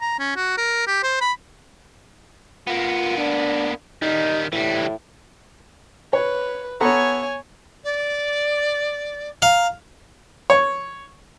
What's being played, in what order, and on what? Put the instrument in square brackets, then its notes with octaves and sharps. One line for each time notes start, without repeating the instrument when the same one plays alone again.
[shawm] A#5
C#4
F#4
A#4
G4
C5
B5
[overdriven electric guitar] A#3 B3 [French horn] F4
[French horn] D4
[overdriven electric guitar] D#3 G3 [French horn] D#4
[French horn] A2 [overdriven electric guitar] E3 G3
[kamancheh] B4 [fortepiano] C#5
[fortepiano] B3 A4 A#5 [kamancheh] C#5 G#5
[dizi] D5
[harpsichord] F5 [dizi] A#5
[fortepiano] C#5